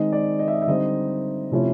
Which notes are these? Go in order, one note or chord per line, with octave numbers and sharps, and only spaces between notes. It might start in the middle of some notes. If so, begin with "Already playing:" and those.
Already playing: D#3 G#3 C4 D#4 D#5
D5
D#5
E5
D#5
E5
D3 G3 C4 D#4 D#5
C3 F3 A3 C#4 E4